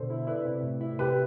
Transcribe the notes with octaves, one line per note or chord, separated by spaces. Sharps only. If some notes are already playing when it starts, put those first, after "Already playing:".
Already playing: B2 D3 A4 C5
E4
E4 B4 D5
C3
A2
E4
C3 G4 B4